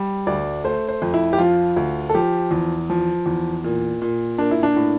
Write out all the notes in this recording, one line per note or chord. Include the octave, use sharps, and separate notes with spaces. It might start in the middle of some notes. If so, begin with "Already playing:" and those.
Already playing: G3
D2 D5
A3 C5
C5
F2
E4
G4
F3 F4
D2
A4
F3 G4
E2
F3
E2
A#2
A#2
A#3 D4
E4
D4
A2